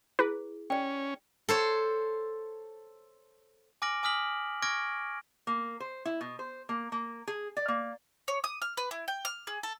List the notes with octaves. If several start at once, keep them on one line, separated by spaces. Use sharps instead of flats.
E4 G#4 B4
C#4 D5 G5
A4 C5 C#5
G#5 D6 F6 A#6 D7 F#7
G#5 D6 D#6 F6 B6 F#7
C#6 D6 F6 G#6 A#6 D7
A#3
C5
E4
B2
C5
A#3
A#3
G#4
D5
A#3
C#5
D#6
F6
B4
E4
G5
F6
G#4
A4